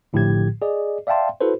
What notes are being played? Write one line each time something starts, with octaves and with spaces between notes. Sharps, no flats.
A#1 A2 D3 F3 G4 G#6
G#4 D5 D#5
D5 E5 F5 G5 A5 C6
E4 F#4 A4 B4 C5